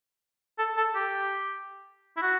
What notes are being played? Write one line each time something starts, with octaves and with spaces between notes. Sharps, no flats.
A4
A4
G4
E4
F#4